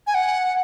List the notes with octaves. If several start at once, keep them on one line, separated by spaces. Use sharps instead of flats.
G#5
F#5